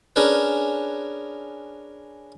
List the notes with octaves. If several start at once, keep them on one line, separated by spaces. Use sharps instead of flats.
C#4 D4 G#4 A#4 B4